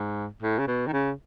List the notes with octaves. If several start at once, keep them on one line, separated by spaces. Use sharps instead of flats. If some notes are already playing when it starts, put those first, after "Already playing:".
Already playing: G#2
A2
C#3
B2
D#3
C#3